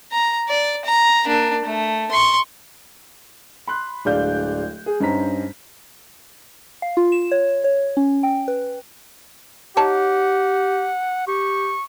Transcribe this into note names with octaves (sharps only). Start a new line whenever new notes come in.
A#5
D5
A#5
A#3 D4
A3
C6 C#6
B5 C6 F#6
D1 G#3 D4 D5 F5 G6
G#4
G2 C#4 D#4 C5 A#5 B6
F5
F4
E7
C#5
C#5
C#4
G5
B4
D#4 G4 C#5 F#5 A5
G4 C#6